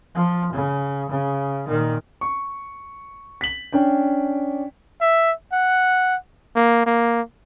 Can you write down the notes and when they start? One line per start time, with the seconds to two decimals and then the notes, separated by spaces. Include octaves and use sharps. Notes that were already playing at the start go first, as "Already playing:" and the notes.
0.14 F3
0.53 C#3
1.10 C#3
1.67 A#2 D#3
2.21 C#6
3.41 B6 F#7
3.72 C#4 D4 G5
5.01 E5
5.53 F#5
6.56 A#3
6.86 A#3